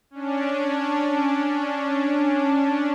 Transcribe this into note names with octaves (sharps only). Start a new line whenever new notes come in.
C#4 D4